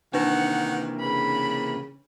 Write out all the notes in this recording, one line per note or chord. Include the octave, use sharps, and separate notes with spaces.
C3 D#3 E3 A#3 D4 B4 F#5
C#3 B5